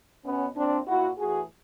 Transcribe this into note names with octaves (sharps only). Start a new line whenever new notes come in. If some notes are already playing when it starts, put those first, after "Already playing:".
B2 B3 C#4
A#2 C4 D4
A#2 E4 F#4
A2 E3 F#4 G#4